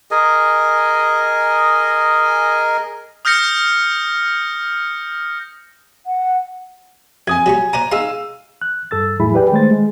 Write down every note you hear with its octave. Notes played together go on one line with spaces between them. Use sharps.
G#4 A#4 D#5 G#5
D#6 F6 G6 A#6 C#7
F#5
F2 G#5 D#6 G#6
F#3 G3 C#6
C5 D5 F#5 A#5 D#7
D#4 G#4 F5 C6 E6
F#6
G2 A4 E6 A6
E2 A2 F#3 E4 G#4 B5
G4 G#4 B4 D5 G5
D#3 G#3 A3 C5 A6
G#3